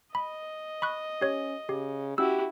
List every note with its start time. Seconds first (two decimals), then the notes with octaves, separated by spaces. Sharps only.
0.15 D#5 B5
0.82 B5 C#6 F#6
1.21 C#4 G4 C#5
1.69 C#3 G4
2.18 C#4 E4 F#4 G4 E6